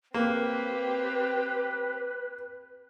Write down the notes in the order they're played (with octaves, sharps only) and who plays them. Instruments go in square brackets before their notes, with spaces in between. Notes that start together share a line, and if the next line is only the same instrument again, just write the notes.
[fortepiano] A#3 [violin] C4 G4 [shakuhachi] B4